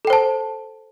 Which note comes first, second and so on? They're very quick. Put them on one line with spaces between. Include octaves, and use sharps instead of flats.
A4 G5 C5 A5